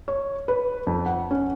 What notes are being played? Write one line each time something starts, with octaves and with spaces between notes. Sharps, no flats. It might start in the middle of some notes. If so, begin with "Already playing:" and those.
C#5
B4
F2
F#5
C#4